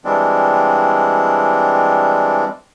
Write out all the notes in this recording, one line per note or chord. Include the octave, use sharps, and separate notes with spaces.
E3 G3 G#3 C4 D4